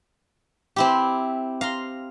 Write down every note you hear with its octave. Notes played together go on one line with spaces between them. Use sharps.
C4 E4 G4
F5 A#5 C6